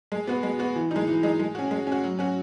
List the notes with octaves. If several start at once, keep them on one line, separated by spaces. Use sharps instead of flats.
G#3
B3 F#4
G#3
B3 F#4
E3
G#3 D#4
E3
G#3 D#4
G#3
C#4 F#4
G#3
C#4 F#4
F#3
C#4 F#4